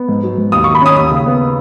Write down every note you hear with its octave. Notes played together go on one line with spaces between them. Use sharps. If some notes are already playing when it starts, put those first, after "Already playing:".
Already playing: B3
G#2
F#3
G#2
D#2 D#6
D#3 C#6
B5
C#4 D#6
D#2 D#6
C#3
B3